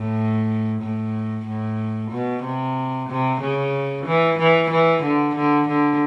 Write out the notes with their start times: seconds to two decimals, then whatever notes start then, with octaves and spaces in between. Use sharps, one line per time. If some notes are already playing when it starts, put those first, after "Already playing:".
Already playing: A2
0.82 A2
1.46 A2
2.11 B2
2.44 C3
3.09 C3
3.41 C#3
4.06 E3
4.38 E3
4.71 E3
5.03 D3
5.36 D3
5.68 D3